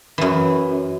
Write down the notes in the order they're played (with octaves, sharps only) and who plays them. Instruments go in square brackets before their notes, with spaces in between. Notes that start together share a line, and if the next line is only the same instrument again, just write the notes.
[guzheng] F#2 E3